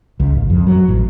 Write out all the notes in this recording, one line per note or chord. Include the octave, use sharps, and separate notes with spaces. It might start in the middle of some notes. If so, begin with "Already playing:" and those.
C#2
A1
F2
F#3
A1